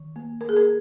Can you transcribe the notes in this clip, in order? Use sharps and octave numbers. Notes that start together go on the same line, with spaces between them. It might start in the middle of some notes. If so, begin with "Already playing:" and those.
Already playing: D#3
A#3
A#3 A#4
G#4
A#4